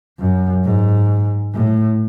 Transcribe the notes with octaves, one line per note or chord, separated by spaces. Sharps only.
F#2
G#2
A2